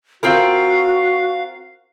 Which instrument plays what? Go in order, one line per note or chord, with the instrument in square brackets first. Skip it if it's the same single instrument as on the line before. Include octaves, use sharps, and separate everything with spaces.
[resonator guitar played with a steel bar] C4 F4 A#4 [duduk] F#4 [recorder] F5